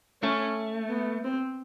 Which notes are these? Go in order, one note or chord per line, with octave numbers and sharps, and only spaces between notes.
A3 C#4
B3
C4